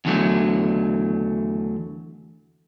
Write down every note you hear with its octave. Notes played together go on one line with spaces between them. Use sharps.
E2 D3 F#3 A3